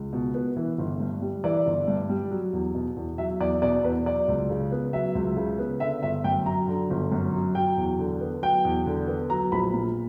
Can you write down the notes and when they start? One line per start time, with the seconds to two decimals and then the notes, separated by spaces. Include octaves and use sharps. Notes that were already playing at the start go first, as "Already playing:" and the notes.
Already playing: C#2
0.13 B2
0.34 B3
0.56 E3
0.78 G1
1.00 G2
1.22 G3
1.44 E3 D5
1.66 G1
1.88 G2
2.09 G3
2.31 F#3
2.53 E2
2.75 B2
2.96 E2
3.18 F#3 E5
3.40 E2 D5
3.62 B2 D5
3.83 E2 B4
4.06 F#3 D5
4.28 C#2
4.50 C#3
4.72 B3
4.93 F#3 E5
5.15 C#2
5.37 C#3
5.59 B3
5.80 D3 E5
6.03 G1 E5
6.24 F#2 G5
6.46 F#3 A#5
6.68 D3
6.90 G1
7.12 F#2
7.33 F#3
7.55 F#3 G5
7.77 E2
7.99 D3
8.21 B3
8.43 F#3 G5
8.65 E2
8.86 D3
9.08 B3
9.30 F#3 A#5
9.52 A#1 B5
9.73 A#2